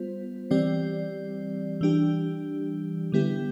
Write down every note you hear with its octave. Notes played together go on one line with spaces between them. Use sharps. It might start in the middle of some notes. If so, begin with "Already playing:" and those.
Already playing: G3 B3 F4 C5
E3 G3 C4 G4 D5
E3 G3 D4 G4
D3 G3 B3 E4 G4